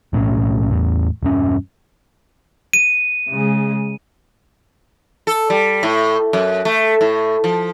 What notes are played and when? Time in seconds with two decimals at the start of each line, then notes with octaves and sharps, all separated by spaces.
0.13 B1 A2 E3 C#4
0.70 E2 A2
1.23 E1 G2 C#4
2.73 D#7
3.29 C#3 G#3
5.27 A4
5.50 G3
5.83 A2
6.33 F#2
6.65 A3
7.01 A2
7.44 F3